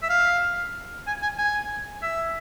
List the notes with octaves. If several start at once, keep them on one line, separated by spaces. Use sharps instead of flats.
E5
F5
G#5
G#5
G#5
E5